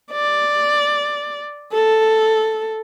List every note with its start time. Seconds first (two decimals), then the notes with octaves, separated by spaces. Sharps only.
0.12 D5
1.73 A4